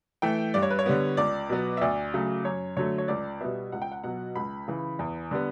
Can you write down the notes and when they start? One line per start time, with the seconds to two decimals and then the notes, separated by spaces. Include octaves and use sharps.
0.22 E3 A3 G5
0.54 G2 D5
0.63 C#5
0.71 B4
0.79 C#5
0.86 D3 G3 B3
1.17 C#2 D5
1.50 B2 F#3 B3
1.77 E5
1.81 D2 D5
2.14 C#3 F#3 A3
2.45 F#2 C#5
2.77 D3 F#3 A3 C#5
2.98 C#5
3.08 C#2 D5
3.41 B2 G3 B3 E5
3.72 C#2 F#5
3.82 G5
3.92 F#5
4.03 B2 F#3 F#5
4.36 C#2 B5
4.68 C#3 E3
4.99 E2
5.31 D3 G3 B3